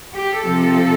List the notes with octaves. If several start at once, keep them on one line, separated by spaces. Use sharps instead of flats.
G4
C3 F3 A4